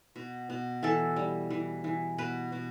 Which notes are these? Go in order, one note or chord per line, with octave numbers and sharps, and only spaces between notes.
B2
B2
E3 A4
G3
E3
E3
B2 B4
B2